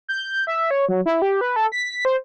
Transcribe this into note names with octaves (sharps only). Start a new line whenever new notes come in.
G6
E5
C#5
F#3
E4
G4
B4
A4
B6
C5